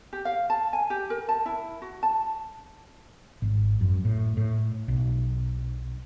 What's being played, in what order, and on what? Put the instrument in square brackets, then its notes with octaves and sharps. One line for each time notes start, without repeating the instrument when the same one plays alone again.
[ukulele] G4
F5
A5
G#5
G4
A#4
A5
E4
F#4
A5
[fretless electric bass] G#1
F#2
A2
A2
B1